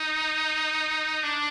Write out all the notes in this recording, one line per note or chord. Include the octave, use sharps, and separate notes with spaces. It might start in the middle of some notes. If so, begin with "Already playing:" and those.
Already playing: D#4
D4